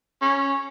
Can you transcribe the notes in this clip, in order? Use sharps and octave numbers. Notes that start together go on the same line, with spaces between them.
C#4